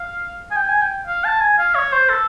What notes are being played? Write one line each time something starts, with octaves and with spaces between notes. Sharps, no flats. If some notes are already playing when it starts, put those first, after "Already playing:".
Already playing: F5
G#5
G5
G#5
G5
F5
A5
G#5
F5
C#5
C5
A4